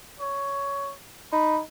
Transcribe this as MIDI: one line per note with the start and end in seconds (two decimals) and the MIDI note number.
0.20 0.93 73
1.33 1.60 63
1.33 1.60 83